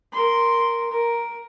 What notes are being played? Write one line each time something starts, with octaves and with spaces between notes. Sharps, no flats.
A#4 C6
A#4